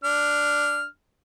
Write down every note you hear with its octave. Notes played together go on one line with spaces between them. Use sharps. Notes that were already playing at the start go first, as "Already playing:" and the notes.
D4 F6